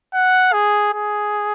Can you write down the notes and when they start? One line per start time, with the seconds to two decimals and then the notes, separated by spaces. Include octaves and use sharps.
0.14 F#5
0.53 G#4
0.93 G#4